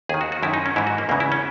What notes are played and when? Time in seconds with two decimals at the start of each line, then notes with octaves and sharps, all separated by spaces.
0.09 D#2 G#4
0.14 D#3
0.21 F#4
0.32 F#4
0.43 F#2 D#3 E4
0.54 D#4
0.66 C#4
0.76 G#2 E3 E4
0.87 F#4
0.98 A#3
1.09 E2 C#3 E3 A#3
1.20 E4
1.32 C#4